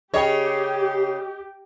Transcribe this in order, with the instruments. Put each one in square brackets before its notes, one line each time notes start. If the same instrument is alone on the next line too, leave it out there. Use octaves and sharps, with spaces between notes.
[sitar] C#3 C#5 [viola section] G4 [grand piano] D#5 G5